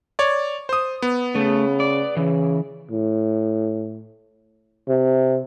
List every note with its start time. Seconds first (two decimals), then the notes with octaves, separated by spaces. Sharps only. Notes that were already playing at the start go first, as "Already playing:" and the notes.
0.19 C#5 D5
0.69 C5 D#6
1.02 B3
1.35 C#3 A3
1.80 D5
2.17 C#3 E3
2.91 A2
4.89 C3